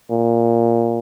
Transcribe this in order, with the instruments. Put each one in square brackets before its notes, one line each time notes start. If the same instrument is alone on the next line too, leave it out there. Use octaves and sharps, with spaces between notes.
[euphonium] A#2